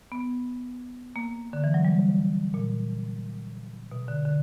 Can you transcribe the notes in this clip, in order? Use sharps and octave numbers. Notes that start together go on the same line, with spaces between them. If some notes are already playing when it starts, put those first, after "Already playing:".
B3
A#3
D3
E3
F#3
G3
A#2
B2
D3
D3